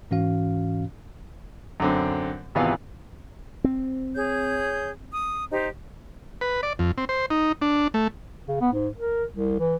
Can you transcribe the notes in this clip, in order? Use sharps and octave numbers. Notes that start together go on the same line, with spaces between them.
G#2 E3 C#4 F#4 F5
F#2 D3 C4
G#1 C3 E3 B3 F4 F5
C4
G#4 C#5 G6
D#6
D#4 G4 C5
B4
D5
F2
C4
C5
D#4
D4
A3
C#3
B3
G#2
A#4
C2
E3